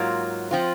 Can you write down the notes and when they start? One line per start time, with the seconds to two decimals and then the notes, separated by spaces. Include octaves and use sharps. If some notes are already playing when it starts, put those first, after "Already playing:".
Already playing: G#2 F#3 A#3 F4
0.51 F3 C4 F4